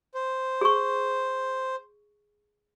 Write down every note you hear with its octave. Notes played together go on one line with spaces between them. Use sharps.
C5
G#4 C#6